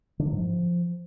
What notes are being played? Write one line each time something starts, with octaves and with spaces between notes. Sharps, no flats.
D3
F#3
G#2
F3